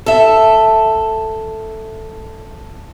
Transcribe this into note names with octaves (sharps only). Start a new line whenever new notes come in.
A4 E5